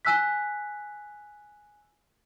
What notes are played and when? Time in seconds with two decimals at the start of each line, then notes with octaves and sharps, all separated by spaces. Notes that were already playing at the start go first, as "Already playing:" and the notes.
0.05 G#5 E6 F#6 B6